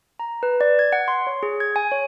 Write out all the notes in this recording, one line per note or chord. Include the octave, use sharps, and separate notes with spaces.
A#5
B4
D5
G#6
F#5
C6
C#5
G#4
G#6
G#5
C#5